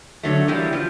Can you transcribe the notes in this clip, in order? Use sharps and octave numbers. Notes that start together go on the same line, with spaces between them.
D3 F#3 A3
E3 G3 A#3 B3
F3